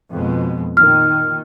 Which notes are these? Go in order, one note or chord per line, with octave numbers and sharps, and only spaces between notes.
F2 B2 G#3
A#2 D#3 F6